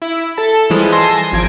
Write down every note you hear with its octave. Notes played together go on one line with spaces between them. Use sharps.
E4
A4 A5
E3 F3 G3 G#3
G#5 A5 C6 E6 A#6 C7
G#1 F3 G#6 D7